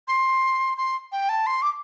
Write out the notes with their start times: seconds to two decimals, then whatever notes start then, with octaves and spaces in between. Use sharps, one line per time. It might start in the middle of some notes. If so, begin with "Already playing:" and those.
0.08 C6
0.78 C6
1.12 G5
1.29 A5
1.47 C6
1.62 D6